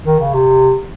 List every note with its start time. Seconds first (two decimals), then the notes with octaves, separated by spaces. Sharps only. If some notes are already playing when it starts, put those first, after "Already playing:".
0.06 D#3
0.20 C#3
0.34 C3